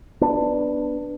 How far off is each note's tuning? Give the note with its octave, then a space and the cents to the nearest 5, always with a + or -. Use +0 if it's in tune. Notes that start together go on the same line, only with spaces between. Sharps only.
B3 +0 D4 +5